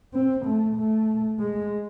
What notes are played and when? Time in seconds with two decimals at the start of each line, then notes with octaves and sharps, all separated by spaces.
0.14 C4
0.45 A3
0.76 A3
1.39 G#3